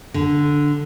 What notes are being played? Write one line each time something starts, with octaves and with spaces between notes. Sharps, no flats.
D3